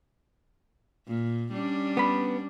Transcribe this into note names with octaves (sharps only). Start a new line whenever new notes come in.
A#2
G3 C#4 D4
B3 B5